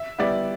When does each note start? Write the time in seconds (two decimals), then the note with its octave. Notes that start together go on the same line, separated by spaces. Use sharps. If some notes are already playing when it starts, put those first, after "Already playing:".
Already playing: E5
0.19 G3 B3 E4 D5